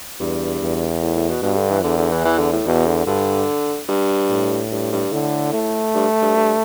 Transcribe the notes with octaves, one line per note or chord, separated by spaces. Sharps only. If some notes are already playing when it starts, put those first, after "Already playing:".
E2 G2
E2
A2
A2
B2
G2 B2
D3
E3
E2 D3
D3
E3
E3
D3
A2
E2 B2
D3
G2 D3
G2
A2
G2
G2
A2 D3
A3
G2
G2
G2